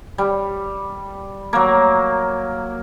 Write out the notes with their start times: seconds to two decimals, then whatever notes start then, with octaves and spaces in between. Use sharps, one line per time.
0.18 G3
1.53 F#3 A#3